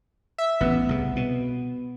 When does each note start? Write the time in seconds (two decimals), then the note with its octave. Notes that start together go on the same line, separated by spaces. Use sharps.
0.38 E5
0.61 A1 B3
0.89 C2 C#3
1.16 B2